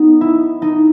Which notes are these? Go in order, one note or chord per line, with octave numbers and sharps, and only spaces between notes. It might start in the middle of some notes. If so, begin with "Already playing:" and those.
Already playing: B3 D#4
E4
D#4